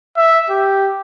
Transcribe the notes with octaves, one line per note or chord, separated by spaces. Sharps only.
E5
G4